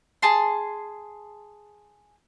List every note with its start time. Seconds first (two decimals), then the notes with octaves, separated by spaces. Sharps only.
0.22 G#4 A5 C6